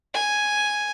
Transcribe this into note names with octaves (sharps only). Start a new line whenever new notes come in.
G#5